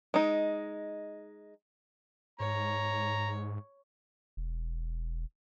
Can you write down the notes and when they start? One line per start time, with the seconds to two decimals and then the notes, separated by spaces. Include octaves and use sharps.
0.14 G#3 D#4
2.40 G#2 C#5 A#5
4.37 E1